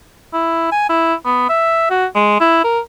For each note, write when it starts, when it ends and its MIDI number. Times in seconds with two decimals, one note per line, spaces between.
0.33 0.70 64
0.72 0.85 80
0.90 1.14 64
1.25 1.48 59
1.49 1.89 76
1.90 2.06 66
2.15 2.38 56
2.40 2.64 64
2.64 2.79 70